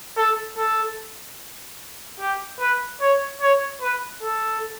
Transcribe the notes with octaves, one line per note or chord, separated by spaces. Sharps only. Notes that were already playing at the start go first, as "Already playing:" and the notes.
A4
A4
G4
B4
C#5
C#5
B4
A4